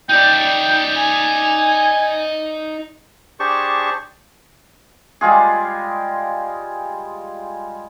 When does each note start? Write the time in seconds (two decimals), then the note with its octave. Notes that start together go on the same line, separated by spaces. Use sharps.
0.09 D#4 D5 G5
0.97 G#5
3.40 D4 G4 G#4 C5 A5 C#6
5.21 G3 G#3 F4 G#4